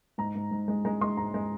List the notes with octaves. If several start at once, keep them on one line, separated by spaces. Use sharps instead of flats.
G#2 A#5
G#2
G#2
G#3
G#3 A#5
G#3 C6
G#2 A#5
G#3